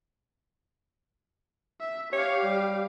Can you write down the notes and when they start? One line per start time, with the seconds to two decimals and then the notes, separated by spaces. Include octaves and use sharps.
1.81 E5
2.13 G4 C#5 F5
2.43 G3